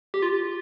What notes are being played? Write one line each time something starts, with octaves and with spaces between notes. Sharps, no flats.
G4
F4